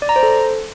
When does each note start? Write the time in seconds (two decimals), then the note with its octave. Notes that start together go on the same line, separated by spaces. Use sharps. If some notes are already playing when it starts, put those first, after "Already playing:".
0.02 D5
0.09 A#5
0.16 C5
0.23 A4